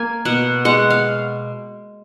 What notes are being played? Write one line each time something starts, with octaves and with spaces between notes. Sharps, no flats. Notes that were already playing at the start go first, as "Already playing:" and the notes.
Already playing: A#3 G#5
B2 F#5
G#3 F#5
F5